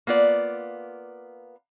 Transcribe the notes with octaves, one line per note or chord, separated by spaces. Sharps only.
A#3 B3 F4 D5